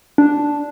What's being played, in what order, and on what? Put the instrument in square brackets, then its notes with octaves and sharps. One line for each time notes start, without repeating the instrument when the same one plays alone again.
[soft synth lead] D4